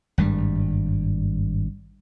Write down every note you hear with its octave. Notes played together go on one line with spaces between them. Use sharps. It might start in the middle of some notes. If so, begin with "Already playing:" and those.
G#1 G2 G3